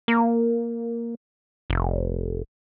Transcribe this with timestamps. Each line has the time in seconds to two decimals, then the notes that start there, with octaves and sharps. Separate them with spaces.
0.08 A#3
1.70 F1